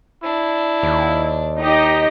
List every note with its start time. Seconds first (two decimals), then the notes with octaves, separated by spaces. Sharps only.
0.24 D4 E4
0.83 D#2
1.60 D#4 G4 D#5